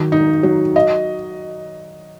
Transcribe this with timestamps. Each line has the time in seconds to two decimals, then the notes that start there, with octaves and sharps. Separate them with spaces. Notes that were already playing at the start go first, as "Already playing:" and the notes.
Already playing: D#3 F#3
0.12 D#4
0.43 F#3
0.76 D#5